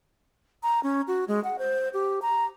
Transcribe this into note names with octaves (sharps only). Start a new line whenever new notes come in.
A#5
C#4
F#4
G#3
F#5
C5
G4
A#5